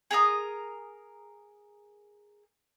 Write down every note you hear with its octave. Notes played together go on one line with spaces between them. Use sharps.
G#4 A#4 A#5 D#6